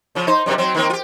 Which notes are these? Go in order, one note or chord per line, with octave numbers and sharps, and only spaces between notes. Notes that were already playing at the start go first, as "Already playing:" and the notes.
C#3 F3
D#4 C5
F#2 C3 G3
F#3 C4
D#3 A#3 C4
F4 G4